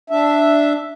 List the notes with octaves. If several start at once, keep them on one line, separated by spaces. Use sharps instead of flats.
D4 E5